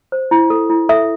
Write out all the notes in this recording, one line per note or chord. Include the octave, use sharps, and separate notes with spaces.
C5
E4
A4
E4
A4 E5